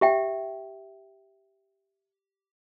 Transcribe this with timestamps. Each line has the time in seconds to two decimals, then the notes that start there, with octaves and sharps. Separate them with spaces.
0.01 G4 E5 G5